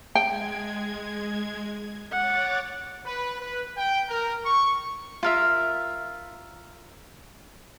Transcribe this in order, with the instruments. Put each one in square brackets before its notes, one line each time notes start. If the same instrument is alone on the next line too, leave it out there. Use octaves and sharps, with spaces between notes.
[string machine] G#3 G#6 [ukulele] G5
[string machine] C#5 D6 A6 [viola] F#5
[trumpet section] B4
B4
G5
A#4
C#6
[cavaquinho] F4 A#4 E5